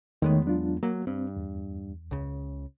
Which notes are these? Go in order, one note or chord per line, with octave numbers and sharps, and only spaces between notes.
E2 D#3 G#3 A3 B3 C#5
F#3 D4 F4
F#3 A#3
G2 C4
E2
C#2 C#3